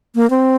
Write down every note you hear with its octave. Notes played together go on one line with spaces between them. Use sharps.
A#3
C4